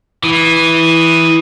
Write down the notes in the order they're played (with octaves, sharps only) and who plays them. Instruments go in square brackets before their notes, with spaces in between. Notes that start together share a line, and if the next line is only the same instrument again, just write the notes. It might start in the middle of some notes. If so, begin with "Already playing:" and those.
[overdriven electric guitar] E3 [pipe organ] D#6